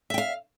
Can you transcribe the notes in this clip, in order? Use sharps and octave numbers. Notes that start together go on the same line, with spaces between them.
E5 F5 G5